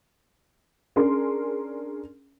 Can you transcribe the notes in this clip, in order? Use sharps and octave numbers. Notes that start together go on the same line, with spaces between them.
C#4 D4 G#4 A#4 C6